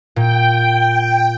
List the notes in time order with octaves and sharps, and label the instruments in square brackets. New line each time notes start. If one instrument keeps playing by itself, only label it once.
[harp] A#2 [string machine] G5